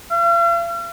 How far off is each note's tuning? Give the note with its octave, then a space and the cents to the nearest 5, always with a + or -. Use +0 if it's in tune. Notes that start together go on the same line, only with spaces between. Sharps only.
F5 -45